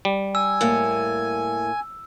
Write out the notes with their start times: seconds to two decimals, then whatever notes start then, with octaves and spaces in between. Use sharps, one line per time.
0.05 G3
0.35 G#5 E6
0.61 A2 A#3